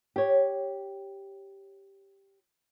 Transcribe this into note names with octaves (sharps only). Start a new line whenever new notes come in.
G4 C#5